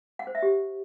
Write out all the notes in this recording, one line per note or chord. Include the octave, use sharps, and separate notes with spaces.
F#5
C5
E5
G4